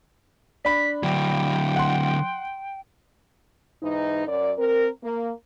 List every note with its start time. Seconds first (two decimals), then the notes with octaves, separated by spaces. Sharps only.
0.65 D4 B5 B6
1.03 D3 F#3 G5
1.76 F#5 C6
3.83 G#2 E3 D#4
4.27 F#2 D5
4.58 C4 A#4
5.03 A#3